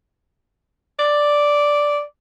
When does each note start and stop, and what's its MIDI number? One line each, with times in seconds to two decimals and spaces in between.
0.99 2.01 74